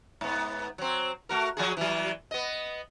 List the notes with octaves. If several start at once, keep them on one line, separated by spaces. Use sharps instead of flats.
G#2 B3
F#3 C4
A3 F#4 A#4
F3 F#4 G#4
E3 F#3
B3 D#5